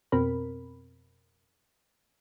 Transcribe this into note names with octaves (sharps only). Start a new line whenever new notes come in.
F2 B2 C4 A#4 B5